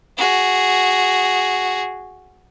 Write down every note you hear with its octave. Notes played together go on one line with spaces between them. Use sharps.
F#4 G#4